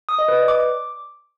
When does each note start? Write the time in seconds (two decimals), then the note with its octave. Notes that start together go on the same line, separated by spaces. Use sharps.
0.09 D#6
0.18 D#5
0.28 B4
0.38 D5
0.48 D6